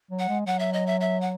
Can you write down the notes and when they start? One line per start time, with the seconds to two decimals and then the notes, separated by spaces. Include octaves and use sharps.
0.11 F#3
0.19 F#5
0.28 G#3
0.46 F#3 F#5
0.59 E5
0.73 D#5
0.87 E5
1.00 E5
1.21 F#5